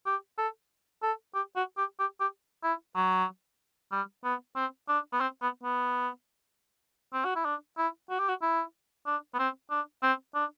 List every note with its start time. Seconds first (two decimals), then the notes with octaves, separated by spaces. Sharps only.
0.06 G4
0.38 A4
1.02 A4
1.35 G4
1.56 F#4
1.78 G4
1.99 G4
2.20 G4
2.63 E4
2.95 F#3
3.91 G3
4.24 B3
4.56 C4
4.88 D4
5.13 B3
5.20 C4
5.42 B3
5.63 B3
7.13 C4
7.25 F#4
7.36 E4
7.45 D4
7.78 E4
8.10 F#4
8.19 G4
8.29 F#4
8.42 E4
9.06 D4
9.34 B3
9.39 C4
9.71 D4
10.03 C4
10.35 D4